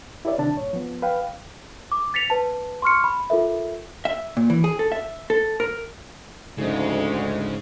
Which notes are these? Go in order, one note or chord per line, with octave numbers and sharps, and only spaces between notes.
E4 G4 A#4 C#5 D5 E5
C3 D#3 D4 A5
G2 A#2 C#5
F3 B3
B4 F5 G5
D6
A6 B6 C#7 F7
B4 A5
C6 C#6 F6 C#7
B5
F4 A4 A#4 E5
E5
A#2
E3
G#4
A4
E5
A4
A#4
D2 G#2 C#3 F3 G#3